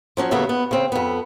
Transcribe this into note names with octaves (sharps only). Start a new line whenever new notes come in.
F3 F#3 C#4
D#2 C#3 F#3 A3 B3 E5
B3
C#3 C4
F2 B3